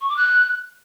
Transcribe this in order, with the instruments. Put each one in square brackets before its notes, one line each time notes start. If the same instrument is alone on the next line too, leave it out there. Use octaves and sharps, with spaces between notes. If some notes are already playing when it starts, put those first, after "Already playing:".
[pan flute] C#6
D6
F#6